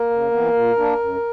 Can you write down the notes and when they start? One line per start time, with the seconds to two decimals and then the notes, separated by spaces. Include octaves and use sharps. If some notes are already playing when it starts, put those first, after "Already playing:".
Already playing: A#3 A#4
0.10 C#3
0.31 E3 B3
0.53 A#2
0.76 A#3 D4
0.99 F#2